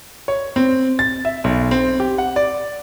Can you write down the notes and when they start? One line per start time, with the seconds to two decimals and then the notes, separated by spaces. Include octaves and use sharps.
0.28 C#5
0.56 C4
0.99 A6
1.25 E5
1.44 B1
1.71 C4
2.00 G4
2.18 F#5
2.36 D5